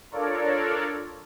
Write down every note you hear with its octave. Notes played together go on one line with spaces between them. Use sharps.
D4 F4 A4 A#4 C#5 D5